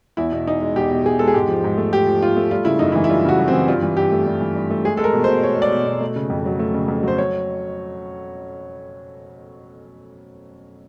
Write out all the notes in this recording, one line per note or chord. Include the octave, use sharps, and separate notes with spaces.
E2 E4
B2
E2 D#4
G#3
E2 G4
B2
E2 G#4
G#3 A4
G#4
G#2 G4
F3
G#2
A3
G#2 G4
F3
G#2 F4
A3
G3 F4
C#3 E4
F#2 D#4
E4
E3
E4
G3 F4
C#3 F#4
F#2
C4
E3
G2 F4
E3
G2 G4
A3
G2
E3
G2
A3
G#3 G#4
G#3 A4
A#4
B2
C5
B2
G#3 C#5
G#3 D5
B2
B2
A3
C#3
F2
F#3
A3
C#3
F2
F#3 C5
C#5